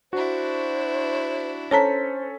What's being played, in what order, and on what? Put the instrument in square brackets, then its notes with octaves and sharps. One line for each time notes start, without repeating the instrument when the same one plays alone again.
[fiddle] D4 E4 [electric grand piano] F#4 [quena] C5
[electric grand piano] C#4 A4 B6 [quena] C5 [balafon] C#5 A5 A#5